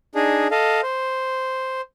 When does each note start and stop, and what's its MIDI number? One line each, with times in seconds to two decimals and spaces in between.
0.15 0.48 62
0.15 0.48 63
0.15 0.48 68
0.51 0.81 69
0.51 0.81 75
0.51 0.81 77
0.83 1.81 72